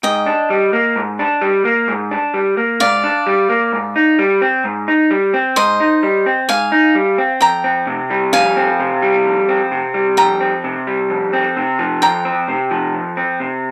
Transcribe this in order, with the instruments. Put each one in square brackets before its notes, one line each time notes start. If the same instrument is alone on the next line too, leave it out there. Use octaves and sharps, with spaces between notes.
[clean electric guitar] G#2 [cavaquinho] D#5 G5
[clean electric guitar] D4
G3
A#3
G#2
D4
G3
A#3
G#2
D4
G3
A#3
[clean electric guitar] G#2 [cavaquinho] D5 F5
[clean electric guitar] D4
G3
A#3
G#2
D#4
G3
C4
G#2
D#4
G3
C4
[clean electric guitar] G#2 [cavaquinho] C5 D#5
[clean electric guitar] D#4
G3
C4
[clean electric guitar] G#2 [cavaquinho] F5 G#5
[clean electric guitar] D#4
G3
C4
[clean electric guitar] F2 [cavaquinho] G5 A#5
[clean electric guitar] C4
C3
G3
[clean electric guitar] F2 [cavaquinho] F5 G#5
[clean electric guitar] C4
C3
G3
F2
C4
C3
G3
[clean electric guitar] F2 [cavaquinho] G5 A#5
[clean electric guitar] C4
C3
G3
F2
C4
C3
F3
[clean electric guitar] F2 [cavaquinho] G5 A#5
[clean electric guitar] C4
C3
F3
F2
C4
C3